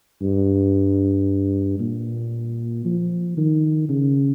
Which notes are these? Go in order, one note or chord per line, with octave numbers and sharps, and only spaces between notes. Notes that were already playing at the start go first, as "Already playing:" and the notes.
G2
A#2
F3
D#3
C#3